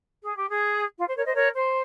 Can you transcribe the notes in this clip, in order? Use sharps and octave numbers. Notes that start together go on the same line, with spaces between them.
G#4
G4
G#4
F4
C5
A#4 C#5
C5 D#5
A#4 C#5
C5